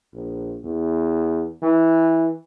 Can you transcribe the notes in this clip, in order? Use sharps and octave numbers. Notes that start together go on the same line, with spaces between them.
A#1
E2
E3